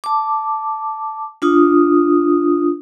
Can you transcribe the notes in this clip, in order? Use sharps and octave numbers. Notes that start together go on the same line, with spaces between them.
A5 D6
D4 F4 D#6